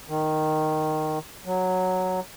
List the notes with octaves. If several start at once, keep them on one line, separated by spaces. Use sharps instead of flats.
D#3
F#3